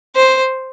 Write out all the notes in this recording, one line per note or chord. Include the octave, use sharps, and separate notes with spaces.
C5